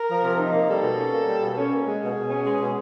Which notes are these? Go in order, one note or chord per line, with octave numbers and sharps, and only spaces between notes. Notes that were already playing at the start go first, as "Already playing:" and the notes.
Already playing: A#4
F3
C3
D#4
A#3
G3 A4
B2
C#4
A#3
G3
B2
C#4
A#3
G#3 G#4
B2
B2
C#4
G#3
B2